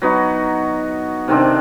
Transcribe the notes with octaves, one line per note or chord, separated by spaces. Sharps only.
F#3 B3 D#4 F#4
C3 D#3 C4 D4